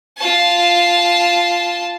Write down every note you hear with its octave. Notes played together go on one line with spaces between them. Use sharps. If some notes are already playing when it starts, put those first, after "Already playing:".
F4 A5